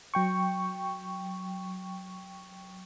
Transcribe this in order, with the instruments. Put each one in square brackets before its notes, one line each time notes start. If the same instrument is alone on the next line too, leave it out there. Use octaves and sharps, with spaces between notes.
[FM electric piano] F#3 G5 C#6